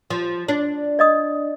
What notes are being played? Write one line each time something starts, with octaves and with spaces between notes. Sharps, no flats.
F3
D4
D5 D#5 D#6